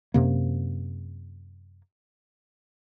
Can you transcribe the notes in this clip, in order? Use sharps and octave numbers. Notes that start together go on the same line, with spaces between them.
F#2 C3 A#3